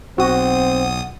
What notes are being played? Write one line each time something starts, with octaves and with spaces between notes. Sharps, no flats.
B1 C4 F#4 F#5 D#6